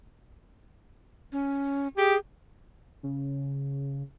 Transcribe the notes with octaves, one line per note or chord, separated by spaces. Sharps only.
C#4
G4 G#4
C#3